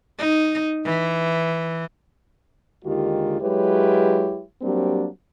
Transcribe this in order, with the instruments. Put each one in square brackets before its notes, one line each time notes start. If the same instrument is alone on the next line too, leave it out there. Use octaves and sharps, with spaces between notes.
[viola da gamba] D#4
E3
[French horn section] D#2 D3 D#3 G#3 F4 G4
F#3 G#3 E4 G4 B4 C#5
F#3 G3 A#3 C4 D4 G4